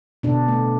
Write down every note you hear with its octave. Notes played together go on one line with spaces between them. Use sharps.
B2 D4
A3